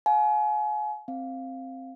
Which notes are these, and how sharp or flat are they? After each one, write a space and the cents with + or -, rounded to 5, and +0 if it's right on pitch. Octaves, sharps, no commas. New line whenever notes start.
F5 +35 G#5 +35
C4 +10 F5 +0